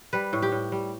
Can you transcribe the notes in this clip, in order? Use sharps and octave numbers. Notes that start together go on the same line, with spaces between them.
G3 B4
A2
G4
A2
G3